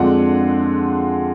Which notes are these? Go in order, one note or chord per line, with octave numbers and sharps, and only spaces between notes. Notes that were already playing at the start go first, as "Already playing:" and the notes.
Already playing: F2 D3 G#3 D4 F4 F#5